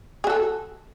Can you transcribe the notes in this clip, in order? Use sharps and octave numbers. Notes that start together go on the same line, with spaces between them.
F#4 G#4 A4